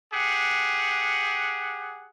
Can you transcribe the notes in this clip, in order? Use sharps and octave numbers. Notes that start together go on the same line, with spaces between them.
G4 G#4 F#5